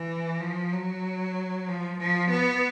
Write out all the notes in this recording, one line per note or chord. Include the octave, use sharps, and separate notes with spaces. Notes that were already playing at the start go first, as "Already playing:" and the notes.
Already playing: E3
F3
F#3
F3
F3
B3